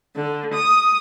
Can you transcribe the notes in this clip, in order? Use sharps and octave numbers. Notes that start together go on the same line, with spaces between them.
D3
D#6